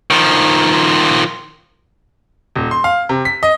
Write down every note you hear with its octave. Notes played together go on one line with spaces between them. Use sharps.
D#3 F3
D#1
C6
F5
C3
B6
D#5